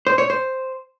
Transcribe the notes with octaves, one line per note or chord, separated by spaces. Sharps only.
C5
C#5
C5